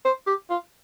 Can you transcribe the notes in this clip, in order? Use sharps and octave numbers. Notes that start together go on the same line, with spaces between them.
C5
G4
F4